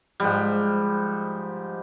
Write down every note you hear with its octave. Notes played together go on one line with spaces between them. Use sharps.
G#2 F3 G3